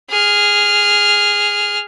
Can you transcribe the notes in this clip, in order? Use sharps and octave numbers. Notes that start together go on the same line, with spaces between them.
G#4 F6